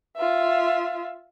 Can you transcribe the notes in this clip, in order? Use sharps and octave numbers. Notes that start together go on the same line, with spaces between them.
F4 E5